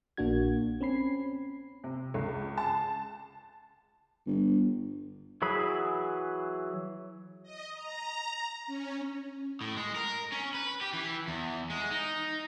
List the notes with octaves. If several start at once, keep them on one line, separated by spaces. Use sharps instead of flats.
A#1 A#3 D4 F#4 G#6
C4 C#4 B5 C7
C3
C#2
A5
G1
E3 F#3 G#4 B5
D#5
A#5
C#4
A2
G#3
A#4
C#4
B4
G4
E3
E2
G#3
D#4